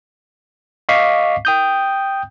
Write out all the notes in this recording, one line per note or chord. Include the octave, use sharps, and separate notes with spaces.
D#5 F5 C#6 D6 B6 C7
G5 D#6 G6